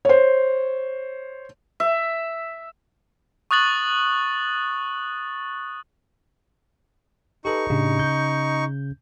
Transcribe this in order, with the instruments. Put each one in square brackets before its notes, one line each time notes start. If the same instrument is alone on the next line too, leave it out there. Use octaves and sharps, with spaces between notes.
[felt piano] C5 C#5
[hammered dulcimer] E5
[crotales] C#6 D#6 F#6 A6 F#7
[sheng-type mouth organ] D#4 C#6 [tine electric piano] G4 A4 B4
[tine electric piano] A2 D4 G4 [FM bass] C#3
[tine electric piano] G6